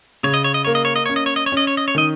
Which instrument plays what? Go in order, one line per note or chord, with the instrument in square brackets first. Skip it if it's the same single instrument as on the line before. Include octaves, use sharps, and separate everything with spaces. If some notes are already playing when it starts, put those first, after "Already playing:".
[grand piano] C#3 [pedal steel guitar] C#5
[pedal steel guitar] D#5
C#5
D#5
[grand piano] A#3 [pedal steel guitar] C#5
[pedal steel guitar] D#5
C#5
D#5
[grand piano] C#4 [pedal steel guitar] C#5
[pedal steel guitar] D#5
C#5
D#5
C#5
[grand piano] C#4 [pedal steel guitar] D#5
[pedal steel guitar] C#5
D#5
C#5
[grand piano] D#3 [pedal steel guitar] D#5